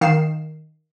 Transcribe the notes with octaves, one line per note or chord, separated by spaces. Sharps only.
D#3 F5 C7 E7